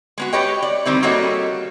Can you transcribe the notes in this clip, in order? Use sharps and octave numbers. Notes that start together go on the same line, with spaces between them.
G#3 B3 F#4
G4 B4 C#5 D#5 G5
D5
D#3 G3 C4 E4
G3 A#3 F#4 A4 C#5 D#5